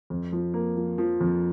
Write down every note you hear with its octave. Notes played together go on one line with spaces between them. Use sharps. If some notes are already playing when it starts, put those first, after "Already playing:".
F2
F3
A#3
F3
F3
F2